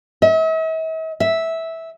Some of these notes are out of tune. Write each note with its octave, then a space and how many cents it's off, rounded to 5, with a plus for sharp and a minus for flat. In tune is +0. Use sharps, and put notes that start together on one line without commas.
E5 -45
E5 -10